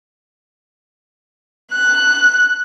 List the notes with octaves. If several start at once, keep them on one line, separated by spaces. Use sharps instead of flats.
F#6